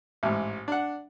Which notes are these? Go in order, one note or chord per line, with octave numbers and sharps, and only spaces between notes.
A1 G#2
D4 F#5